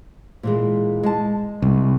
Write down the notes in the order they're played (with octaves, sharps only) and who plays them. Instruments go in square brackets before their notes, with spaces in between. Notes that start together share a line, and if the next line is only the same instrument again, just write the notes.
[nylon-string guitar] A#2 E3 G#3
G#3 A5
[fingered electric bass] C2